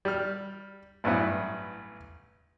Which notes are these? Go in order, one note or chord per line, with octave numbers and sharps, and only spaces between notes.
G3 F6
A1 G2 F#3 B3 E4